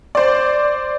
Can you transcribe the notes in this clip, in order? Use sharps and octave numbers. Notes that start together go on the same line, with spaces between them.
C5 D5